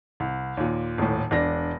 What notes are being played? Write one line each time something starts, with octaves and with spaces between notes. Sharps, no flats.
C2
D#2 A#2
D#1 A2
E1 D4 A#6